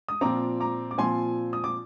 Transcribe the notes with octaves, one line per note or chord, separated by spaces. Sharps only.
D#6
A#2 F3 C4 A#5 D6
A#5 D6
D6
A#2 F3 C4 G#5 C6
D#6
D6